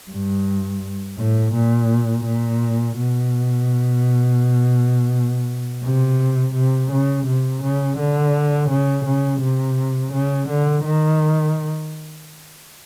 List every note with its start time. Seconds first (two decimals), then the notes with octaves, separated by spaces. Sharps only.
0.11 G2
1.18 A2
1.54 A#2
2.25 A#2
2.97 B2
5.84 C3
6.55 C3
6.92 C#3
7.26 C3
7.63 C#3
7.98 D3
8.70 C#3
9.05 C#3
9.41 C3
10.13 C#3
10.49 D3
10.84 D#3